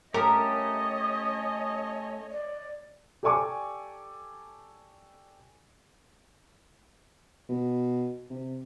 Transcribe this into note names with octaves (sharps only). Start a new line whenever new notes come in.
A3 C#4 G4 A#4 C#5 D#5 D#6
D5
G4 A4 D5 G#5 C#6 D6
B2
C3